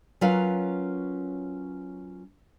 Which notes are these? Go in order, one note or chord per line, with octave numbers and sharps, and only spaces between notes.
F#3 C#4 F4 A#4 B4 F5